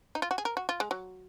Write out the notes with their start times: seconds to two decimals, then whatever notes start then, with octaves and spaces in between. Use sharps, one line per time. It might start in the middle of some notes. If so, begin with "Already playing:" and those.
0.15 D#4
0.22 F4
0.31 F#4
0.38 G#4
0.45 A#4
0.57 F#4
0.69 F4
0.80 G#3
0.91 F#3